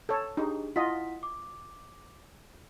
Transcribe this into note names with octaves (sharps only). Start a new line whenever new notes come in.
A4 C#5
D4 D#4 G4 G#4
E4 F4 D#5 F#5 B6
D6